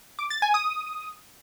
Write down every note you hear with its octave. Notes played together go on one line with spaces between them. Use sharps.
D6
A6
G#5
D#6